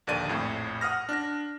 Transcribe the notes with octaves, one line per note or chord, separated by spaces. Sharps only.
A#1 D#2 D3 D5 D#7
A#1 F2 A2
F#5 D#6 F6 A#6
D4 A#6